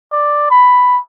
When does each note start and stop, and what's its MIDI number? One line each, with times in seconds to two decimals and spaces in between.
0.12 0.47 74
0.51 0.99 83